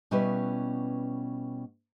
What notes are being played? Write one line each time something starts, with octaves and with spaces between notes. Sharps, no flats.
B2 G3 B3 C#4 E4 B4